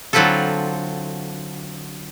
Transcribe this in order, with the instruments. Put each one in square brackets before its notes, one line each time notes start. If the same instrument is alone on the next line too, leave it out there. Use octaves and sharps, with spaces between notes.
[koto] D3 F#3 C4 E4 F4 A4